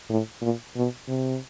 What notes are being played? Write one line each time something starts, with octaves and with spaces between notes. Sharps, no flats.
A2
A#2
B2
C3